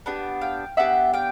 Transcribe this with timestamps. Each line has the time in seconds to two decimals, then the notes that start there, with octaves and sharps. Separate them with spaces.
0.06 B3 D4 G4
0.41 F5 G5
0.77 B3 D4 G4 E5 F#5
1.14 F5 G5